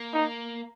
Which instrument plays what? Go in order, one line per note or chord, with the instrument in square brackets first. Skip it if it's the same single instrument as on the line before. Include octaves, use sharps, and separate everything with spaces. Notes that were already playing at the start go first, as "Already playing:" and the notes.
Already playing: [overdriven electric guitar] A#3
[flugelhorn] D#4